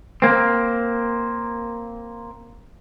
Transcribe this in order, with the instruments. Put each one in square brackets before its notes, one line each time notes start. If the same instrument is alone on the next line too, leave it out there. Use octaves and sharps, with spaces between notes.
[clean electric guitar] A#3 C4